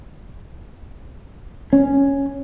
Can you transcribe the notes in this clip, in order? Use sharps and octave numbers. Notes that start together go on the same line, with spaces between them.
C#4